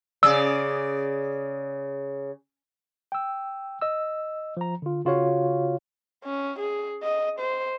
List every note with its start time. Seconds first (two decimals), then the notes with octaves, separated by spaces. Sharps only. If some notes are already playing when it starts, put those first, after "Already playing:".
0.23 C#3 G#4 D5 E6
3.12 G5 E6
3.82 D#5 E6
4.57 F3 A#5
4.82 D3 F4
5.05 C#3 F4 F#4 C#5 F5
6.24 C#4
6.59 G#4
7.03 D#5
7.39 C5